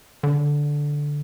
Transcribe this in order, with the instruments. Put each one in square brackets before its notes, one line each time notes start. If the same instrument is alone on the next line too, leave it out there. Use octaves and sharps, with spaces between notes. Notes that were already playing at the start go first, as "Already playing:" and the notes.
[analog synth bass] D3